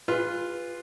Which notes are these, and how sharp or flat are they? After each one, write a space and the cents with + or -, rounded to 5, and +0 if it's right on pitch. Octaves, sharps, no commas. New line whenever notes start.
F4 +0 G#4 -40 B4 +0